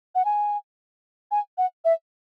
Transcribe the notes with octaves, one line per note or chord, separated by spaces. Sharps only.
F#5
G#5
G#5
F#5
E5